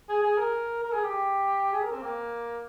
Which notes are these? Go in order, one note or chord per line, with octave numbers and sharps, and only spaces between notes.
G#4
G#4
A#4
A#4
G#4
G4
G#4
A#4
C4
A#3